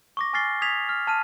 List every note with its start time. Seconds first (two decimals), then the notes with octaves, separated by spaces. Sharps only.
0.17 C#6 D6 A#6
0.33 G#5 C#6 F6 A6 C7 G7
0.61 D#6 G#6 B6 F7
0.89 F6
1.07 A5 F6 D#7